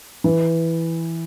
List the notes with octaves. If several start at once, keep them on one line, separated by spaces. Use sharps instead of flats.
E3